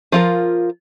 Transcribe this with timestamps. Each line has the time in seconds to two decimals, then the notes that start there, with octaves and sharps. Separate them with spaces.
0.12 F3 F4 A#4